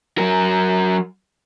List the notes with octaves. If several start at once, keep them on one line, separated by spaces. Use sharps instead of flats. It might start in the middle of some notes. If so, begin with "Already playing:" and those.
F#3 A#4